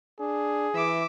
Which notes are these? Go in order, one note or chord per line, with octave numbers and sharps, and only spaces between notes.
D4 G#4
E3 E5 D6